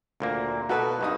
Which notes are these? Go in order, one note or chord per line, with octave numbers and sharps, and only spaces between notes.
D2 A#2 A#3
B2 F#4 A4 B4
C2 G2 D#4 D#6